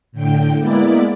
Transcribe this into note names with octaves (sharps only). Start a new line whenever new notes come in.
A2 D3 G5
G#3 A#3 B3 E4 D5